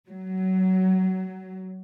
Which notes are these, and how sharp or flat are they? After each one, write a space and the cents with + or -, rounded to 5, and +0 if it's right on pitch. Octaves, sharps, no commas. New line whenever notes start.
F#3 +20